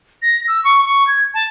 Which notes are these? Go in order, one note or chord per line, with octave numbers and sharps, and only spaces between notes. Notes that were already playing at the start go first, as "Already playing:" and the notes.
A#6
E6
C#6
C#6
G#6
A5